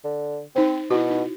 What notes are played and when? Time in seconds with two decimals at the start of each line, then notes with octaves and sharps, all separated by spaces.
0.04 D3
0.56 C4 D#4 C5
0.90 B2 E4 F#4
1.10 D#4